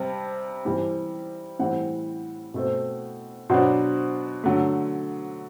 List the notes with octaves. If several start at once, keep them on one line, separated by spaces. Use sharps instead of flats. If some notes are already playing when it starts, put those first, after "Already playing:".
Already playing: C3 G3 C4 A5
C3 E3 G3
A2 E3 G3 C4 F#5
B2 A3 C4
B2 F#3 B3 D4 C5
D3 F#3 A3